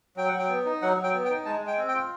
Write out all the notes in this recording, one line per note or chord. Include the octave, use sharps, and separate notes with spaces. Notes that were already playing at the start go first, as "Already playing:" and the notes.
F#3 G5
F#5
F#3
G5
B3
D#4
F#3 F#5
F#3
G5
B3
G5
D#4
G#3 A5
G#3
G5
C4
G5
F4